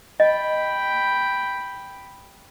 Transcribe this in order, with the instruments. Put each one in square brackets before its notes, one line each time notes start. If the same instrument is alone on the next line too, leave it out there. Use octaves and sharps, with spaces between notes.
[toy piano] D#5 [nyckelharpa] G5 B5